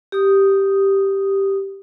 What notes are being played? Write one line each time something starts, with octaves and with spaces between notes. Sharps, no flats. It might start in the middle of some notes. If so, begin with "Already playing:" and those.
G4 D#6